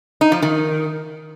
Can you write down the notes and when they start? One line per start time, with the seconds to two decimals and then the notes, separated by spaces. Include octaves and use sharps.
0.21 D#4
0.32 F3
0.42 D#3